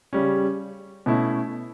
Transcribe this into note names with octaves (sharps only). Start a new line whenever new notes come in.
C#3 G3 C#4
B2 A3 C#4 E4